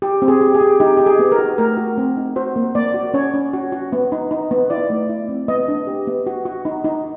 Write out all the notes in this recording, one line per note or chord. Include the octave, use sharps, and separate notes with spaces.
G4
C4
G#4
G4
G#4
G4
D#4 G4
D#4 G4
G#4
B3
A#4
F#4
A3 A#4
F#4
C4
D#4
F#4 C5
A#3
A#3 D5
F#4
C#4 C#5
C#4
F#4
F#4
B3
D#4
D#4
B3
E4 D5
A3
E4
C4
B3 D#5
D4
G4
B3
F#4
F#4
D#4
D#4